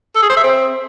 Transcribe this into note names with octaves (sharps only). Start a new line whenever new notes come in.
A4
G#4
C5
E5
C4